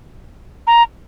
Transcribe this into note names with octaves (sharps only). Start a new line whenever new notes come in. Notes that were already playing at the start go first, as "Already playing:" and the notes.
A#5